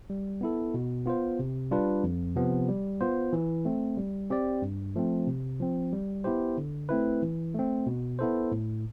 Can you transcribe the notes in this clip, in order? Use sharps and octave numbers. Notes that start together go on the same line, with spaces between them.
G3
B3 E4 A4
B2
B3 F4 C5
C3
G3 D4 F4 B4
F2
C3 F3 B3
G3
B3 F4 C5
E3
A3 C4
G3
C4 G4 D5
G2
F3 A3 C4
C3
F3 C4
G3
B3 E4 G4 C5
D3
A3 C4 E4 B4
E3
A3 C4
B2
B3 E4 A4 C5
A2